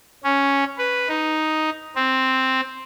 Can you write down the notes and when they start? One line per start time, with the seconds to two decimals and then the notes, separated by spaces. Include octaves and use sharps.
0.24 C#4
0.78 B4
1.09 D#4
1.96 C4